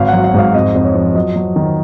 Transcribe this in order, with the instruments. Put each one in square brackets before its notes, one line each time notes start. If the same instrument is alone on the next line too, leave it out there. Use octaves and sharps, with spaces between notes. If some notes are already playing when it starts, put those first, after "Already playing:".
Already playing: [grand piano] G#1 F5
F#3 F#5
F#5
G#2 F5
F2 D#5
F2
C#5
F3
F#3 D#5
F#3
D#3